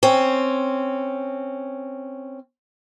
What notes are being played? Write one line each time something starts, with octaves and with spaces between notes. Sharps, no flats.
C4 C#4